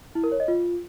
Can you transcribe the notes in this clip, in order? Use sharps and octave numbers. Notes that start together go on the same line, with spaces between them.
E4
A#4
C#5
D#5
F4